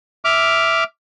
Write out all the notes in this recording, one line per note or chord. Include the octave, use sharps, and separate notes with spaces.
E5 D6 F6